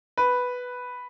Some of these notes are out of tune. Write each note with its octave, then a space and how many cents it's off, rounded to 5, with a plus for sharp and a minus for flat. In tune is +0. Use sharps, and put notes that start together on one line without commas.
B4 +0